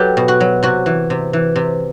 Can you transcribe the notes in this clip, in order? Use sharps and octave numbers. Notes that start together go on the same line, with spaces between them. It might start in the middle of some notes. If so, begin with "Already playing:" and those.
Already playing: F#3 G4 A4 B4
B2
F#4
F#3
C3 F#4
E3
C3
E3
C3